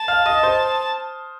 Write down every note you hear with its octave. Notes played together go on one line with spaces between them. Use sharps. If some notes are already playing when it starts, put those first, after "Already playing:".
Already playing: A5
F5 F6
D#5 D#6
C5 C6